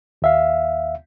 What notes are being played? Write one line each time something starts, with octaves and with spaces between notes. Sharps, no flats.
D#2 E5 F5